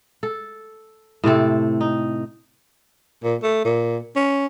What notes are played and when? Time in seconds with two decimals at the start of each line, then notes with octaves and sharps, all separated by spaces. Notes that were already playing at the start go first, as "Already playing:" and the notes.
0.23 A4
1.24 A2 C3 C4 A4
1.81 D#4
3.24 A#2
3.42 A3
3.64 A#2
4.16 C#4